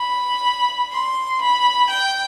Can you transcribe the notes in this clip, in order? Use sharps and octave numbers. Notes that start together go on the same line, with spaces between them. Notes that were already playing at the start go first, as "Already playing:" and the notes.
Already playing: B5
C6
B5
G5